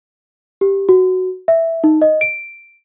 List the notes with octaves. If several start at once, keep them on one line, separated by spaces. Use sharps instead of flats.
G4
F#4
E5
D#4
D#5
D7